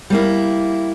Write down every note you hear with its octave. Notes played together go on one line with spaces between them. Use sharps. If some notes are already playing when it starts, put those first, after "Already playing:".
G3 A#3 E4